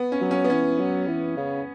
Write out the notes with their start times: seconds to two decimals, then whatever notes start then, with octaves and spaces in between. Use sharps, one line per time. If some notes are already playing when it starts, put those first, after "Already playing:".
Already playing: B3
0.12 C#4
0.21 F#3
0.31 C#4
0.44 B3
0.50 E3 C#4
0.79 F#3
1.07 E3
1.37 C#3